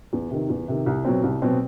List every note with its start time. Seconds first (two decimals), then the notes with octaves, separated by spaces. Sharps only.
0.13 E2
0.31 C3 D#3
0.50 E2
0.68 C3 D#3
0.86 C2
1.05 B2 F#3 C4
1.23 C2
1.42 B2 F#3 C4